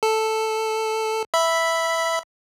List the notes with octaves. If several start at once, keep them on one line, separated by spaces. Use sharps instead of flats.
A4
E5 B5